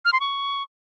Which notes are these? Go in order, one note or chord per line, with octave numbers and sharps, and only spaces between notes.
F6
C6
C#6